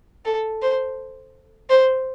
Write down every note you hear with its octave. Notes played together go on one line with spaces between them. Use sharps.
A4
C5
C5